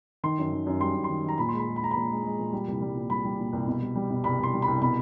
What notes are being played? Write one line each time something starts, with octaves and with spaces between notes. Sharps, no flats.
D#3 C6
F#2
D#3
F#2
G3 C6
F#2
C6
D#3
D#3 A#5
A#2 B5
C6
G#3 B5
G#3
B5
G#3 A#5
A#2 B5
G#3
G#3
A#2
G3
C2
G3
A#2
G3 B5
G3
A#2
C2
B2
G3
G3
B2
C2 B5
C2 C6
G3
B5
C2
B2 B5